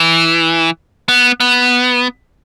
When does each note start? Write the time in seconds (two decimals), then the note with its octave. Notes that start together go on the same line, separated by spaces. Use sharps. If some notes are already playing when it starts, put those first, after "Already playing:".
Already playing: E3
1.09 B3
1.40 B3